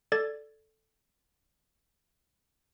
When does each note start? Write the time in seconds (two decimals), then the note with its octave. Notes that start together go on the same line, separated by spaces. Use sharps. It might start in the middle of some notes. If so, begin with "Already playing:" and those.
0.12 A4 D5 G#6 A6